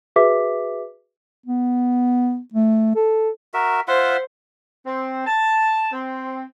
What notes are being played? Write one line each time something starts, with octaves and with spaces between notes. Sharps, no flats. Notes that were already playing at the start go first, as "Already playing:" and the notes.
F#4 G#4 B4 E5 D6 B6
B3
A3
A4
F#4 A#4 E5
F4 C5 E5 F#5
C4
A5
C4